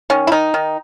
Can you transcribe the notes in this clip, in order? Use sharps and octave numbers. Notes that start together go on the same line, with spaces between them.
D#3 C#4
E4
D#3 D#4
D#3